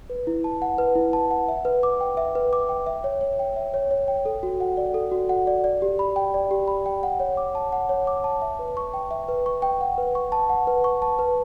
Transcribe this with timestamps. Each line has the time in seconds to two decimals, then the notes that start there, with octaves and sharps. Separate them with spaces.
0.10 B4
0.27 E4
0.44 A5
0.62 F#5
0.78 B4
0.95 E4
1.13 A5
1.31 F#5
1.48 E5
1.65 B4
1.83 D6
2.00 G5
2.17 E5
2.35 B4
2.53 D6
2.69 G5
2.86 E5
3.04 C#5
3.21 C#5
3.39 G5
3.56 E5
3.74 C#5
3.91 C#5
4.08 G5
4.25 A4
4.43 F#4
4.60 F#5
4.77 D5
4.94 A4
5.12 F#4
5.29 F#5
5.47 D5
5.64 D5
5.82 G4
5.99 B5
6.16 G5
6.34 D5
6.51 G4
6.68 B5
6.86 G5
7.03 F#5
7.20 C#5
7.37 D6
7.55 A5
7.72 F#5
7.89 C#5
8.07 D6
8.24 A5
8.42 E5
8.59 B4
8.77 C#6
8.94 G5
9.11 E5
9.28 B4
9.46 C#6
9.62 G5
9.81 F#5
9.98 B4
10.15 C#6
10.32 A5
10.50 F#5
10.67 B4
10.84 C#6
11.02 A5
11.19 B4